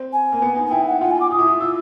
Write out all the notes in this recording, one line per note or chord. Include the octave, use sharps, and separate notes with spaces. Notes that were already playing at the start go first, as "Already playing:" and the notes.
Already playing: C4
G#5
A#3
B3
D#4
G#5
E4 G5
F#5
F4 F#5
G#5
D6
F4 D#6
E4
F4
F4 E6